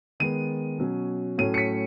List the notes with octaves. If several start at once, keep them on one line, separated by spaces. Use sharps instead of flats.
D#3 G#3 B3 D#7
B2 F#3 C#4
A2 F#3 A3 C#4 D#7
C#7
B6